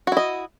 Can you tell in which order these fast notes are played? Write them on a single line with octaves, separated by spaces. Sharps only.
F#4 E4 D#5